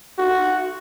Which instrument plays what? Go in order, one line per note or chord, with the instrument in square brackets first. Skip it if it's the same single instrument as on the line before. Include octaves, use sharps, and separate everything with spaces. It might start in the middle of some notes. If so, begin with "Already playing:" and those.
[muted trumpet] F#4